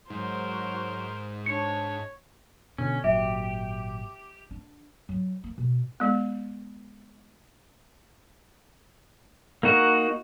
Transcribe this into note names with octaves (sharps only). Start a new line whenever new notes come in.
G#2 F#3 A#4 C5
D4 C#5 C#7
B2 D3 C#4
G#1 A#2 F#3 G4 E5
D4
F#3
A#3
B2
G#3 B3
A#3 D#4 F#4